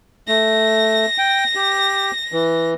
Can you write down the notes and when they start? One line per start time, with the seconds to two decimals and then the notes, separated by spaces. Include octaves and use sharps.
0.28 A3 A#6
1.18 G5
1.55 G4
2.32 E3